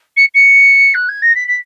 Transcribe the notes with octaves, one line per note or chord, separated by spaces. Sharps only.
C#7
C#7
F#6
G#6
A#6
B6
B6